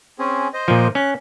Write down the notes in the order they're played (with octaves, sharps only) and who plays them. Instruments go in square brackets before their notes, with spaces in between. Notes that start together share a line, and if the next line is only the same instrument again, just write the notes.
[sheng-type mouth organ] C4 C#4 G#4
C5 D#5
[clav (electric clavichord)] A#2 F3
[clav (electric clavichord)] C#4 [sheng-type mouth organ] F#6